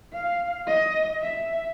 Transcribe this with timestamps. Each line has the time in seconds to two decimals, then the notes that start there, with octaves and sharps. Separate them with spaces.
0.12 F5
0.67 D#5
1.22 E5